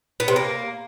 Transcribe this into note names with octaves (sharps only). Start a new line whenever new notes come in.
B3
C3
A#3